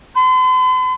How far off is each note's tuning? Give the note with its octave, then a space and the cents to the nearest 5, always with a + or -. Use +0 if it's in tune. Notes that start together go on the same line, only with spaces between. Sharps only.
C6 -45